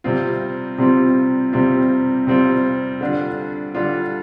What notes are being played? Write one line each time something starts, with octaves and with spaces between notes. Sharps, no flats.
C3 G3 C4 F4
C3 G3 C4 F4
C3 G3 C4 F4
C3 G3 C4 F4
D3 G3 D4 F4
D3 G3 D4 F4